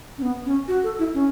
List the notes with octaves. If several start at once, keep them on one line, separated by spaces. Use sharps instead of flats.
C#4
B3
C#4
F#4
A4
E4
C#4